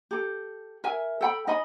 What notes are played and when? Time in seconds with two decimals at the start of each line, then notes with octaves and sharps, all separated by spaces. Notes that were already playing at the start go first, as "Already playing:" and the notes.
0.11 G4 A4
0.84 A#4 E5 G#5
1.21 A4 G5 B5
1.47 D#4 D#5 G#5 B5